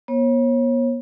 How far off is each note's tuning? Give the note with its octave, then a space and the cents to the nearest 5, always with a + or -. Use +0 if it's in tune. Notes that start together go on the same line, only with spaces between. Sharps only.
B3 -45 C#5 -35